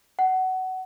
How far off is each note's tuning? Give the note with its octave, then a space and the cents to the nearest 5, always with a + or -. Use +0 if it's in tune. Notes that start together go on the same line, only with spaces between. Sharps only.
F#5 +20